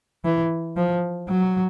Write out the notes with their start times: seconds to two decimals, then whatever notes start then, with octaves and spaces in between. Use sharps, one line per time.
0.25 E3
0.76 F3
1.29 F#3